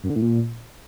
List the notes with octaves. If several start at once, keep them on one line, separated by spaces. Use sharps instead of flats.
F#2
D3
A2
A#2